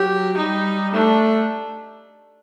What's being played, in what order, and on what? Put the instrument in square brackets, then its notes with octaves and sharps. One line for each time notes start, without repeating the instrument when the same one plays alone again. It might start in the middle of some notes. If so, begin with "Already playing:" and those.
Already playing: [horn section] F#3 [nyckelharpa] G4
[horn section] G3 [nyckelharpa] D#4
[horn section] A3 [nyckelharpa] D4